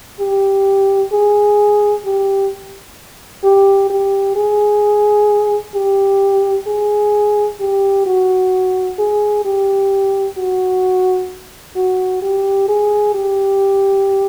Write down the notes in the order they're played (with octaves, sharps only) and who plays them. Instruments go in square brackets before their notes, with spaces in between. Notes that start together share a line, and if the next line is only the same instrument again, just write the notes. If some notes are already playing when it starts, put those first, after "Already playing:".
[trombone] G4
G#4
G4
G4
G4
G#4
G4
G#4
G4
F#4
G#4
G4
F#4
F#4
G4
G#4
G4